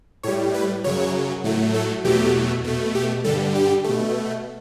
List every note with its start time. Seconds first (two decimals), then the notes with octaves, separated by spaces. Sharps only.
0.23 A2 G3 C#5
0.54 B4
0.84 F#2 C#3 F#3 C#5
1.44 A2 F#3 A3
1.74 A4
2.04 E2 B2 F#3 A3 G4
2.64 B2 A3
2.95 G4
3.24 G2 D3 G3 A4
3.55 G4
3.84 B2 A3